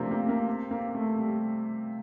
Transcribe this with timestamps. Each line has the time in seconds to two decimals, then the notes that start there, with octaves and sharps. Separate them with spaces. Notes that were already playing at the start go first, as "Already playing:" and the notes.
Already playing: C3 F3 A3 A#3 D4
0.11 A#3
0.29 A#3
0.71 A#3
0.95 A3
1.18 G3